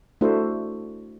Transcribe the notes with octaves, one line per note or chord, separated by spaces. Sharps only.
A3 D4 E4 F#4 A4 C5